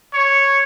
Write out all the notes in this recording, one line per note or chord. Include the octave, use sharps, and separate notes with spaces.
C#5